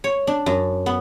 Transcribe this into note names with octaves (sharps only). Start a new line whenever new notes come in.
C#5
D4
F#2
B3